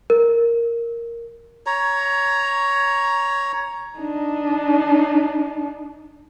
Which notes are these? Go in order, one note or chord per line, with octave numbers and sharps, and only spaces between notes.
A#4
C#5 A#5
D4 D#4